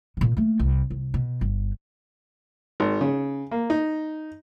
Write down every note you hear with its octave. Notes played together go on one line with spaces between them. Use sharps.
A#2 C#3
A3 A#3
C2
C2
B2
G1
G#1
C#3
A#3
D#4